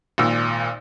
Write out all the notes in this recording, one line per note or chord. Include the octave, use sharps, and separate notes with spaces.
G#1 A#2 E6